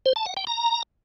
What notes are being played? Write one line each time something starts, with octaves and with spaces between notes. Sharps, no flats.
C5
A5
F#5
G5
A#5